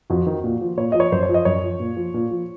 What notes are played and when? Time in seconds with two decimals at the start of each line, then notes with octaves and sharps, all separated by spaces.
0.10 F2 F#4
0.26 D#3
0.44 A#2
0.61 F3
0.77 A#2 C#5
0.92 F3 D#5
1.00 C#5
1.12 F#2 C5
1.23 C#5
1.29 F3
1.34 D#5
1.45 F#2 C#5
1.63 F3
1.80 A#2
1.97 F3
2.14 A#2
2.31 F3